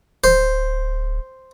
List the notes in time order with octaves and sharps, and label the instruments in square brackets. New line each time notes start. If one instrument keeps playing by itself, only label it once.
[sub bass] D1 [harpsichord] C5